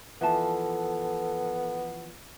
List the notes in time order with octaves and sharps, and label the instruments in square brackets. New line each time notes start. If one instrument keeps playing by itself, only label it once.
[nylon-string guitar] E3 F3 A5 [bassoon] B3 [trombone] A4